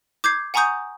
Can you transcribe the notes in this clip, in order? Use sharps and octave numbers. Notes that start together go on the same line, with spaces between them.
D6 G6 G#6 C7
F#5 G#5 A#5 C#6 D#6 G6